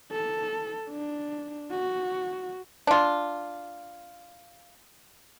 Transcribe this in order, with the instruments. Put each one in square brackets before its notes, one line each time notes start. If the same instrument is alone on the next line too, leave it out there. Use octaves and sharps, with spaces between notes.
[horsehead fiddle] A4
D4
F#4
[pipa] D4 F4